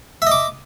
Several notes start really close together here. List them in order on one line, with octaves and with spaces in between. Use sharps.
E5 D#5 D6